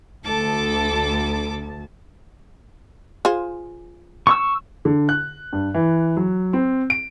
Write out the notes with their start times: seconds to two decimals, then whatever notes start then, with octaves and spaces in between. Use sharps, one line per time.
0.25 D2 A4 A5 D6
3.25 F4 G#4 C5
4.27 C#6 E6
4.85 D3
5.09 F#6
5.53 G2
5.74 E3
6.17 F#3
6.53 C4
6.90 D7